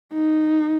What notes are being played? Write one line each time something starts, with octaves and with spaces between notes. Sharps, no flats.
D#4